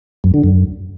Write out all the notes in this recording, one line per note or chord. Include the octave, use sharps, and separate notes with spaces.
F#2
D3
F#2